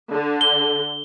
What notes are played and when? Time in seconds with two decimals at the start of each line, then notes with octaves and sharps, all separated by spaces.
0.12 D3
0.41 G7